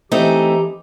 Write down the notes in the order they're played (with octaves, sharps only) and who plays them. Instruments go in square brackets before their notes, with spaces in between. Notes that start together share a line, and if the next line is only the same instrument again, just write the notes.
[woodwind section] E3 [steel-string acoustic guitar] A3 C4 E4 [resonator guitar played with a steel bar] D#4 [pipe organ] G4